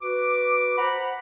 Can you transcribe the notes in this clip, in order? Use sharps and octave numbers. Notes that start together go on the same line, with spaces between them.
F#4 B4 D6
C5 F#5 A#5 B5